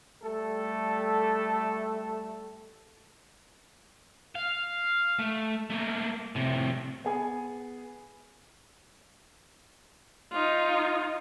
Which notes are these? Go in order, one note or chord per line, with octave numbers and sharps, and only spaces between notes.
G3 A3 A4
F5
A3
A3 A#3
A2 C3
B3 G#4 G#5
D#4 F4